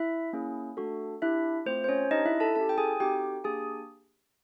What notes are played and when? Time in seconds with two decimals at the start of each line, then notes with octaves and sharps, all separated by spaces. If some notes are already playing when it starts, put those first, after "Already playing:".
Already playing: E4 E5
0.33 A#3 C#4 E4 G#4
0.77 A3 D4 F#4 A4
1.22 D4 E4 G4 E5
1.66 A3 C4 F4 C5
1.84 C5
1.88 C#4 C#5
2.11 D4 D#4 G4 D#5
2.26 E4 E5
2.40 A4 A5
2.55 C#4 E4 G4 A4 A5
2.69 G5
2.78 G#4 G#5
3.00 C4 D#4 F#4 G4 A4 G5
3.44 A#3 D4 G4 G#4 G#5